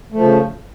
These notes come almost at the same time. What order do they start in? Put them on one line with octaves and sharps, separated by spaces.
A3 F3 C#3